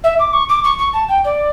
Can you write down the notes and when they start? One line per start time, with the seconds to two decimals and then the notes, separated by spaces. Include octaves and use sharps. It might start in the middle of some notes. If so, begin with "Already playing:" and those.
0.04 E5
0.19 D6
0.33 C#6
0.49 D6
0.64 C#6
0.78 C#6
0.93 A5
1.09 G5
1.24 D5